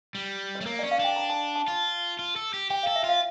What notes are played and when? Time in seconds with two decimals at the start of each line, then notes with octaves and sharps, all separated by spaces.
0.15 G3
0.55 C#5
0.61 A3
0.66 A#3 A#4
0.79 C#4 D5
0.91 F5
0.99 D4 G5
1.16 A#5
1.30 A5
1.56 A5
1.68 F4 A5
2.19 F4
2.36 A4
2.54 G4
2.70 G4 G5
2.83 A4 F5
2.96 E5
3.04 F4 F5